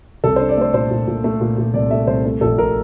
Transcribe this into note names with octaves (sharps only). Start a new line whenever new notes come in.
C2 A4
D4 C5
D5
A3 C5
A#2 C5
A#2
A#2
A3
A#2
A#2
C2 D5
A3 E5
C2 C5
A3
A#1 A4
A#2 A#4